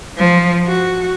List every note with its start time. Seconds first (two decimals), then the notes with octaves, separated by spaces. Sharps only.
0.17 F3
0.66 F#4